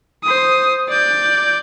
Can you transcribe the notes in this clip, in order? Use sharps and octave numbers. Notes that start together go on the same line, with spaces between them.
C5 D#6
D5 G6